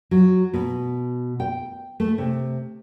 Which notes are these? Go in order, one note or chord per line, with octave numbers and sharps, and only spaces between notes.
F#3
B2
G5
A3
C3